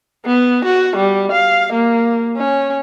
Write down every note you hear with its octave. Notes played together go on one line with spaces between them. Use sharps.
B3
F#4
G3
F5
A#3
C#4